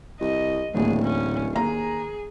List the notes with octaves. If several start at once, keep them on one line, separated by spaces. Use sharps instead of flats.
C2 D#5
D1 A1 D#2 G#4
C#4
D#2 G#4 A#5